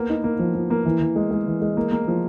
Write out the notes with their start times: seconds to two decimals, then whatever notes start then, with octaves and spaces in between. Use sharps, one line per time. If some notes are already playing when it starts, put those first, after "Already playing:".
Already playing: A#3 B3
0.09 D#4
0.24 A#3
0.39 F3
0.55 F3
0.70 A#3
0.85 E3
1.01 E3
1.16 G#3
1.31 G#3
1.47 E3
1.62 G#3
1.77 A#3
1.92 A#3
2.08 F3